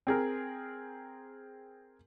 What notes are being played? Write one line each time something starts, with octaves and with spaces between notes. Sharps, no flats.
C4 G#4 A#4